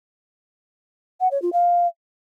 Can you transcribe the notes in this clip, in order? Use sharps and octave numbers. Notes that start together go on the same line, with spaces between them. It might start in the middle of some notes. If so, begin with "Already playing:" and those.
F#5
C#5
F4
F5